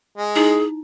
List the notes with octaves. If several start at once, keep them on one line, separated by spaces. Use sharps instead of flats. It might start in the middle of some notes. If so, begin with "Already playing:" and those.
G#3
D#4 E4 G#4